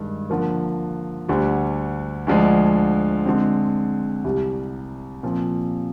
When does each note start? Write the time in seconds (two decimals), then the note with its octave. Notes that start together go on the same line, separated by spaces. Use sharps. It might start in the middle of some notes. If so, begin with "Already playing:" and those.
Already playing: G2 D#3 G#3 D4
0.30 D3 F3 A#3
1.28 D2 D3 G3
2.27 D2 D3 F3 G#3 D4
3.25 D3 G#3 C4
4.24 C2 C3 G3
5.23 A#2 F3 C4